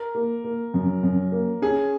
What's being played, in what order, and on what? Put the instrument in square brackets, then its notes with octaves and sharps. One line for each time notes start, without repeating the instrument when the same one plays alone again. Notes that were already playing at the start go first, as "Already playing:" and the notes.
Already playing: [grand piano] A#4
[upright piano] A#3
A#3
F#2
F#2
A#3
[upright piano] C#4 [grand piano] G#4